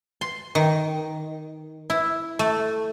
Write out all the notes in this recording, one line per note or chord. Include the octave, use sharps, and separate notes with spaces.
C6
D#3
E4
A3